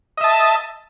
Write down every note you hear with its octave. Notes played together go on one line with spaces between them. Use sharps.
D#5 E5 A5